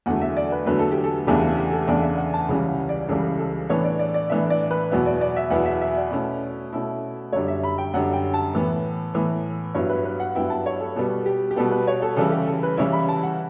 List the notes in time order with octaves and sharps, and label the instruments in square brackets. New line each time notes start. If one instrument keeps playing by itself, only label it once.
[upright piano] E2 D3 F#3 A3 F#5
E5
D5
B4
E2 D3 F#3 A3 B4
A4
G4
A4
E2 C#3 E3 A3 D4 G4
A4
G4
A4
E2 C#3 E3 A3 D4 D5
E5
F#5
A5
C#2 C#3 E3 G3 C#4
F#5
D5
C#2 C#3 E3 G3 C#4 A4
A4
A2 E3 B3 D4 C#5
D5
D5
D5
A2 E3 B3 D4 E5
D5
B4
E2 B2 F#3 B3 E4
D5
D5
E5
E2 B2 F#3 B3 E4 F#5
E5
E5
D5
B2 A3 C#4 E4
B2 A3 C#4 E4
F#2 D3 G3 C#5
E5
B5
G5
F#2 D3 G3 F#5
G5
A5
A2 E3 B3
A2 E3 B3
G2 F#3 B3 E4 C#5
B4
B4
F#5
G2 F#3 B3 E4 G5
A5
C#5
A4
B2 G3 B3 A4
G4
G4
B2 G3 B3 A4
B4
C#5
A4
C#3 E3 G3 C#4 E4 A4
G4
A4
B4
C#3 E3 G3 C#4 E4 C#5
B5
A5
F#5